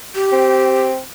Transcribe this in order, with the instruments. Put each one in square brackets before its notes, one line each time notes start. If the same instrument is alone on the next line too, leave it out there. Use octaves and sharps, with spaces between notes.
[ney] G4
[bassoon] C4